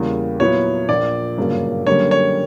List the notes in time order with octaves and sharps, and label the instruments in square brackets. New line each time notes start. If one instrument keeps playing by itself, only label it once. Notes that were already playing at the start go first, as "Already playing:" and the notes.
Already playing: [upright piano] E2 C#3 G3 A#3
[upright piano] A#2 F#3 B3 E4 [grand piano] C#5
[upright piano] A#1 A#2 A#3 [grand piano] D5
[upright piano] G1 F#2 C#3 F#3 A#3
[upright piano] F#2 D3 G3 A#3 C#4 [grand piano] C#5
[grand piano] C#5